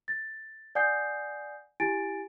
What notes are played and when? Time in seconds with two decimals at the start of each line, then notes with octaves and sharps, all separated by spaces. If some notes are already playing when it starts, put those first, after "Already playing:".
0.08 A6
0.75 D5 F#5 G#5 D#6 G6 C7
1.80 E4 G4 G#5 A6 D7